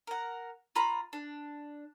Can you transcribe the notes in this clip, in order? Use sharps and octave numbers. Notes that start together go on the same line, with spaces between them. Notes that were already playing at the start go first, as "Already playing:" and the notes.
A#4 F#5
F4 A#5 B5
D4